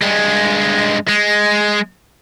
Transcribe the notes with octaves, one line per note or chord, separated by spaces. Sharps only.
G2 G#3
G#3